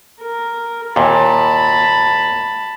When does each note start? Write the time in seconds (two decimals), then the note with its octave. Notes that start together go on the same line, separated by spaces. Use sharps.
0.22 A#4
0.96 D#2 A#2 A5 B5